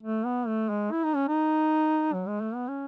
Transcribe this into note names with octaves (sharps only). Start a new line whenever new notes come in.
A3
B3
A3
G#3
E4
D#4
C#4
D#4
F#3
G#3
A3
B3
C#4